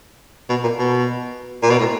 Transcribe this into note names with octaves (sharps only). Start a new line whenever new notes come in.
B2
A#2
B2
A#2
B2
A2